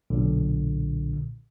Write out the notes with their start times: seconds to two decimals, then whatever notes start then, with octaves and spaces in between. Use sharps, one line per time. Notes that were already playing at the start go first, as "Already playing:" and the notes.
0.10 B1 A#2 D3